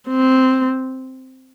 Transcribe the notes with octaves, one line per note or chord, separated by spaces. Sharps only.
C4